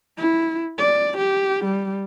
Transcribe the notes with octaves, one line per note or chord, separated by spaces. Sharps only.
E4
D5
G4
G3